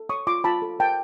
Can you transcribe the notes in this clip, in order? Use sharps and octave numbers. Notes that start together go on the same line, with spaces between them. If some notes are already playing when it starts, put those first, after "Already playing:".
Already playing: A4
C#5 C#6 D#6
F4 C6 D6
F4 A5 B5
A4
A#4 G5 A5